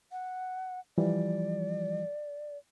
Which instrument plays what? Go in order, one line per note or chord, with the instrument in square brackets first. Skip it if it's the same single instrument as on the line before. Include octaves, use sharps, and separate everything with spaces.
[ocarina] F#5
[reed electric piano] E3 F3 G3 [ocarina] D5